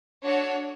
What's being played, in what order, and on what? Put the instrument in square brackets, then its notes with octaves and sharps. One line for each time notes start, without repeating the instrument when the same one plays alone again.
[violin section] D4 F#4 A4 C#5